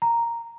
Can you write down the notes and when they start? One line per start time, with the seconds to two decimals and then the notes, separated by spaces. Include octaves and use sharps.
0.02 A#5